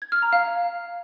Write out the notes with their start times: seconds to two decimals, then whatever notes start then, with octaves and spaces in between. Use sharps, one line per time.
0.02 G#6
0.12 F6
0.22 A#5
0.33 F5